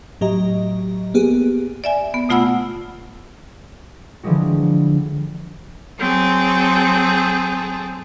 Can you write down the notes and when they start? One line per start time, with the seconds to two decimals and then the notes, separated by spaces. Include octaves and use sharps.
0.21 A2 F#3 G4 D#5 A#5
1.14 A#3 B3 G4 G#4
1.84 D5 E5 G#5
2.14 B3
2.29 B2 A3 F4 F#5 B5 E6
4.23 D3 E3 F3 G3 G#3 F#4
5.98 F#3 C4 G#4 A4